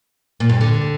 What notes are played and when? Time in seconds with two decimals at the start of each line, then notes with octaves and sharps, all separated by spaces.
0.40 A#2
0.49 G2
0.61 D3